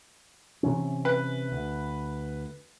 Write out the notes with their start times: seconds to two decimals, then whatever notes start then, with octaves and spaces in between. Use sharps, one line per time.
0.63 C3 E3 C#4
1.05 B4
1.52 D2